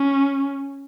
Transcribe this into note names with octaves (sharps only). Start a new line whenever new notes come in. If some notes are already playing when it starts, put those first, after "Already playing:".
Already playing: C#4